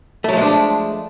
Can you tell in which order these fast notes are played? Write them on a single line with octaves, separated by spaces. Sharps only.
A3 F#3 F3 G#3 D4